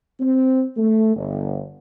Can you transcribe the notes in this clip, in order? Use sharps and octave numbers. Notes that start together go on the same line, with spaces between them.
C4
A3
G1